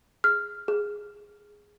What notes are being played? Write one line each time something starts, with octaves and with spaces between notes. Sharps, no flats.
G#4 F6
G#4